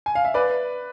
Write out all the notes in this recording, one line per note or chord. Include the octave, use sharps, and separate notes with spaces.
G#5
F5
E5
B4 D5